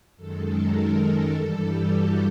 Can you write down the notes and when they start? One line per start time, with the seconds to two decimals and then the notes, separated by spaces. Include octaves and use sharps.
0.16 F#2 D#3 G#3 A4
0.45 A#4
1.31 G2 E3 G3 A4
1.61 G4
1.90 F#4